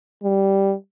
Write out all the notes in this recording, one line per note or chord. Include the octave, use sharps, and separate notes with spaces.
G3